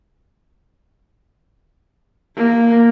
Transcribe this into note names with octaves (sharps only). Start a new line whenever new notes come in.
A#3